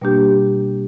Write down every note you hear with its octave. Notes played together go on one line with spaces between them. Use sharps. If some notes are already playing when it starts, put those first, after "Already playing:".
B2 G3 A#3 D4 G4